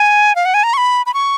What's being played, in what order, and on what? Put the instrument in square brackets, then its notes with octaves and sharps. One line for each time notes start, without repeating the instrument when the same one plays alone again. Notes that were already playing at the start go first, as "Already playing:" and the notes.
Already playing: [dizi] G#5
F5
F#5
G#5
A#5
C#6
B5
B5
C#6